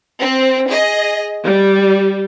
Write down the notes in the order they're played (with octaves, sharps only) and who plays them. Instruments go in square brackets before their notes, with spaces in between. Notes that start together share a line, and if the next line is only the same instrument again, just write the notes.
[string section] C4
G#4 D#5
G3